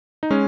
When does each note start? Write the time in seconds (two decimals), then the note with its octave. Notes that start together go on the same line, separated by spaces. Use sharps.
0.23 D#4
0.30 G#3 C#4